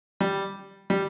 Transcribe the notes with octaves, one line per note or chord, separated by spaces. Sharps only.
G3
G3